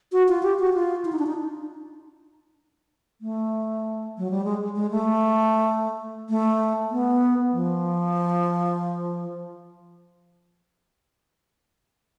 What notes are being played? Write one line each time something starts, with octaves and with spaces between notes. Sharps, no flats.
F#4
F4
G4
F#4
F4
E4
D#4
D4
D#4
A3
F#3
G3
G#3
G#3
A3
A3
B3
F3